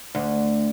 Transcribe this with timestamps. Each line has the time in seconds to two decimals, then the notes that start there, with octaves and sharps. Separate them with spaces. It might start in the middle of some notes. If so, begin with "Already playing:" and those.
0.15 D2